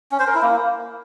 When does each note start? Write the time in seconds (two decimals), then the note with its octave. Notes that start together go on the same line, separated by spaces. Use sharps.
0.12 C#4
0.19 C5
0.27 A#4
0.35 E4
0.42 A#3